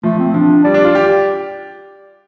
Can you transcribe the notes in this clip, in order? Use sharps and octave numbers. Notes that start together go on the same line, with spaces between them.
F3 A3
C4
F3 D4
G3 D5
D4
F4
G4